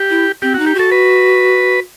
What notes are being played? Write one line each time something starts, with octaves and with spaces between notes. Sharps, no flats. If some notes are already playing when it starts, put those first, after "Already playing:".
Already playing: G4
E4
C4 G4
D#4 F#4
G4
F#4 A4
B4